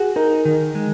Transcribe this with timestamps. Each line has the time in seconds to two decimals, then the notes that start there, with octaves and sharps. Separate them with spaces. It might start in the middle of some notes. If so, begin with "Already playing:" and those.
Already playing: F#4 G#4
0.16 D#4 A#4
0.45 D#3
0.75 G#3